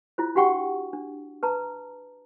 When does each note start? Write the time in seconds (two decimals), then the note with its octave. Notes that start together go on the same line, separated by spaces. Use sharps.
0.18 E4 F4 C5
0.35 D4 F#4 G4 F#5 G5 C#6
0.93 D4
1.43 B4 A5 A#5